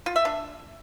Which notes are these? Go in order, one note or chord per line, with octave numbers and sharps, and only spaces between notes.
F4
E5
D4